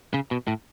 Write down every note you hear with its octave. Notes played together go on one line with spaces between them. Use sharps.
C#3
B2
A2